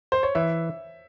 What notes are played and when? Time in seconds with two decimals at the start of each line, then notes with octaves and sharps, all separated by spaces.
0.12 C5
0.23 C#5
0.35 E3 E5